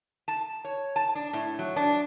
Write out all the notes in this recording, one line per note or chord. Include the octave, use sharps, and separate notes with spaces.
A5
C#5
A5
D4
A2
F#3
D4